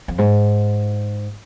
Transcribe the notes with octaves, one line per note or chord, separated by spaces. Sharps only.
F2
G#2